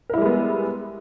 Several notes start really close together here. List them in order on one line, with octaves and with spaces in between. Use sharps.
A#4 E4 G3 G#3 B3